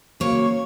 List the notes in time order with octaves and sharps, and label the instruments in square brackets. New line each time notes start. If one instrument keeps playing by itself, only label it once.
[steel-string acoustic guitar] C#3 F#3 A#3 C#5